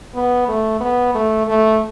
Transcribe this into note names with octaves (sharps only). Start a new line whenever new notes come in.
B3
A3
B3
A3
A3